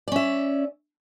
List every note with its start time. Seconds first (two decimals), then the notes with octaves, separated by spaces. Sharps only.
0.08 D5
0.12 C#4
0.16 E5